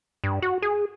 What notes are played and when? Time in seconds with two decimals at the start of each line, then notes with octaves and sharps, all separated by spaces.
0.24 G2
0.42 F#4
0.62 G#4